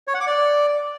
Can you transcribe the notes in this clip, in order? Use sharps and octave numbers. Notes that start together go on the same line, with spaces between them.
C#5
F#5
D6
D5